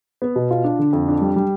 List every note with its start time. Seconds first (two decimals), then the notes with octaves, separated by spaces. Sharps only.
0.22 B3
0.36 B2
0.51 F4
0.64 D4
0.79 D3
0.93 F2
1.08 D4
1.21 G3
1.36 G3